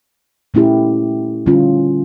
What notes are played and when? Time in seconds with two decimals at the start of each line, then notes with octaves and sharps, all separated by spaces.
0.54 A#2 A3 C#4 E4 G4
1.46 D3 G3 C#4 F4